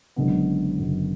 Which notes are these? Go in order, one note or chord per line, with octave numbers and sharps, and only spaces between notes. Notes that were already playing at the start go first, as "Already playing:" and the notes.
F#1 F#2 D3 G#3 B3
F#1 F#2 D3 G#3 B3